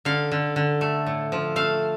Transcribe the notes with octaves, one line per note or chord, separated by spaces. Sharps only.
D3 F5
D3
D3
A3
A2
F3
A3 F5